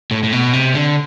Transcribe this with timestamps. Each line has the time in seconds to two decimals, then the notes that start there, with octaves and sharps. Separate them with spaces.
0.11 A2
0.23 A2
0.32 B2
0.53 C3
0.74 D3